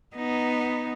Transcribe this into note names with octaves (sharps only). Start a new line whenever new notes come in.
B3 D#4